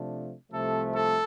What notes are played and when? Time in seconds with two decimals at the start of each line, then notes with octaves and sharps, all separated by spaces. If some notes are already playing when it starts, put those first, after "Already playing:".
Already playing: C3 F3 A3 D4
0.51 C2 C3 F3 A3 A4
0.93 A4